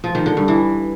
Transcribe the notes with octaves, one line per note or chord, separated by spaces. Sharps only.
F3
D#3
D3
G2
E3